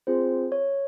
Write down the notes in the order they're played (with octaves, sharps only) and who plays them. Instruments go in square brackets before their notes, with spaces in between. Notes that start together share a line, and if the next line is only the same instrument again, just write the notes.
[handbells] C4 F4 G#4 C5
C#5